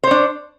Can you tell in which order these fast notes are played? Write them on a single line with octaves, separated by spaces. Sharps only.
C5 C#5 D4